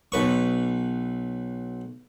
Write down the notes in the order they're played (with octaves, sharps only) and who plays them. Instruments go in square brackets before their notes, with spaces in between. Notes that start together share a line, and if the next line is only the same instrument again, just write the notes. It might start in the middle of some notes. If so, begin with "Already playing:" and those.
[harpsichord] B1 B4 C#6